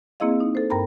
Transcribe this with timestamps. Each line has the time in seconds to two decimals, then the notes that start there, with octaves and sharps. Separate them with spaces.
0.20 A#3 C4 E4 G#4 D#5 F5
0.40 D#4
0.55 A4 C5
0.70 G2 A#4 G5 A#5 B5